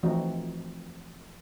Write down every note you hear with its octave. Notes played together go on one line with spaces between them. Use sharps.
E3 F3 A3 C4 D#4 F#4